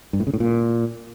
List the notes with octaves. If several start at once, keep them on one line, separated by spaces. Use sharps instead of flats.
G2
A2
C#3
A2
A#2